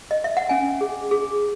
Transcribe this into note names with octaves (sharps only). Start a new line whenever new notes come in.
D#5
E5
F#5
C#4 G#5
G#4
G#4